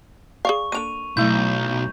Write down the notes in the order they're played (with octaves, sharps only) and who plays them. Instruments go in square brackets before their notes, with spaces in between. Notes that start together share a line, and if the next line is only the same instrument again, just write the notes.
[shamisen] G#4 D5 F5 [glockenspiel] C#6
[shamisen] A#3 D4 A4 [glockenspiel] D#7 F7
[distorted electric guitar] B1 [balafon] F#3 A3 E4 [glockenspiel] G6